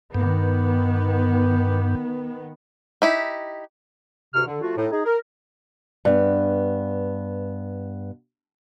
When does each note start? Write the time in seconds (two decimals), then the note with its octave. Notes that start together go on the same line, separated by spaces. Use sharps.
0.15 G2 D#3 B3
3.02 D#4 E4 G4
4.34 D2 G2 C3 F#4 F6
4.46 D3
4.61 F3 A3 F4 F#4
4.76 A2 D#4
4.91 D#4 G#4
5.06 A#4
6.05 G2 B3